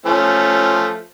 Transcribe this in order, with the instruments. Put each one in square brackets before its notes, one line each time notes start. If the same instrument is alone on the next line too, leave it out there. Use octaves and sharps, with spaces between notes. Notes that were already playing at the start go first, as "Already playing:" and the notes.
[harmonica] F3 A3 C#4